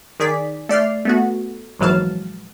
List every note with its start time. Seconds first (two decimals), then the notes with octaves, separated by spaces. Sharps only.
0.20 D#3 G#4 D5 B6
0.69 A3 D5 C6 F6
1.05 A3 B3 F#4
1.79 A#1 G#2 E3 F#3 F5 A5